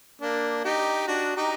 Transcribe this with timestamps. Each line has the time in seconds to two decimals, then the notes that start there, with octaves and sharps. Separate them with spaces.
0.21 A#3 D4
0.64 D#4 G4
1.07 D4 F#4
1.36 D#4 G4